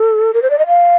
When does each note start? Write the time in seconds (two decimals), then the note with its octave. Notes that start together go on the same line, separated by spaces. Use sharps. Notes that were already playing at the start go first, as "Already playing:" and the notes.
Already playing: A4
0.34 A#4
0.42 C5
0.50 D5
0.59 D#5
0.67 F5